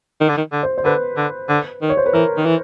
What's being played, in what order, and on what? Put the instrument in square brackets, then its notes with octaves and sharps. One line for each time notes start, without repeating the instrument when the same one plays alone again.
[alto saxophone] D#3
D3
D#3
D3
[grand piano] C5
C5
[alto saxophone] D3 [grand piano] B4
[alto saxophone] D3
D3
D#3
[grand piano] C#5
C5
B4
[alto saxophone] E3 [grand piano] A#4
[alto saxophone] D#3
E3